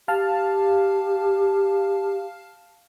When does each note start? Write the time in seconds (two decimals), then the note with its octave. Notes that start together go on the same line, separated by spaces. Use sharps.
0.08 G4 F5 A5 F6